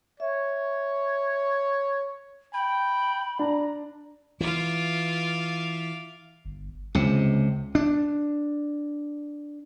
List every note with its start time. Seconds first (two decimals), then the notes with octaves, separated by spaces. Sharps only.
0.20 C#5 E5
2.53 G5 B5
3.39 D4 A#5
4.41 E3 F4 E5 F5 D6
6.45 G1
6.95 C#2 C3
7.75 D4